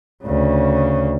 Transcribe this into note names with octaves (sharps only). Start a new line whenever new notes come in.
D2 C#3